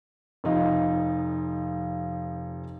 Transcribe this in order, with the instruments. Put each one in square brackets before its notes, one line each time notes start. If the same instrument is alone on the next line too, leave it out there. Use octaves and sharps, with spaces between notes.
[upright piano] F1 F3 D#4 F4 D#5